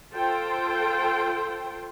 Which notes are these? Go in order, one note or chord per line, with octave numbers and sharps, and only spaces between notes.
F4 A4 C5 G5